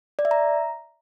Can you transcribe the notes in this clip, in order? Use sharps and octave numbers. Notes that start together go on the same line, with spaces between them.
D5
E5
A#5